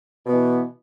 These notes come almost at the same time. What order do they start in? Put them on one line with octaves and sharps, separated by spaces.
B2 B3 E3